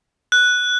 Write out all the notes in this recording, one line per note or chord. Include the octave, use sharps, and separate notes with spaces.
F#6